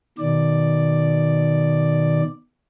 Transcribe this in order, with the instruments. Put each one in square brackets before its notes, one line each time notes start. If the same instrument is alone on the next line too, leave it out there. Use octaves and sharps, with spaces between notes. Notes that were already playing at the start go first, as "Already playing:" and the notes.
[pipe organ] B2 D#3 D5